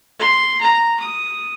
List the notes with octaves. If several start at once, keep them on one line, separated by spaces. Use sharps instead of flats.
C6
A#5
D#6